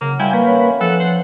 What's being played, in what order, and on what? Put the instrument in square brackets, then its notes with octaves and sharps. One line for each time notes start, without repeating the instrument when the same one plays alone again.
[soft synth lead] C#3 [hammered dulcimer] F#3 [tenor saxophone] A#3
[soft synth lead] G3 [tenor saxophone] E4 [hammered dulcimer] F4 [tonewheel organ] G5 G#5
[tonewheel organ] A#3 B4 [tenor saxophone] F#4
[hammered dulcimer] E3 C#4 [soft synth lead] C#5
[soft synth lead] F3 [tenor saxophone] A4 [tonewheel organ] F#5
[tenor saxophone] C5